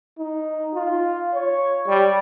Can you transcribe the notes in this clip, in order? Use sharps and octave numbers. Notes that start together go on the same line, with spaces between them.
D#4
F4
C#5
G3